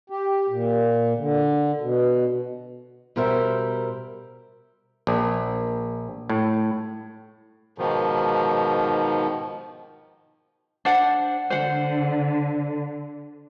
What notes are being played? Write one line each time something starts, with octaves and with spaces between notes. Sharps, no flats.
G4
A#2
D3
B2
B2 G3 A#4 C5 E5
A#1
A2
G#2 B2 D#3 F3
D4 C5 F#5
D3 C5 F#5